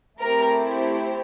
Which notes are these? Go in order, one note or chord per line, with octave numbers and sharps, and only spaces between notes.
A3 C4 E4 G4 A#4